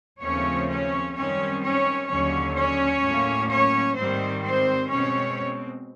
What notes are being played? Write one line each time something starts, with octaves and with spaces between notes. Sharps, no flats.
D#2 C#3 F3 A3 C4 C#4 C#5
C#4 C#5
F#2 D#3 G3 C4 C#4 C#5
C#4 C#5
D#2 D3 F#3 C#4 C#5
C#4 C#5
A2 F#3 A#3
C#4 C#5
G#2 D#3 G3 C4 C5
C4 C5
B2 G#3 C4 C#4 C#5